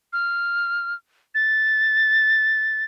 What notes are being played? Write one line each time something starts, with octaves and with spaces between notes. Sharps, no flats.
F6
A6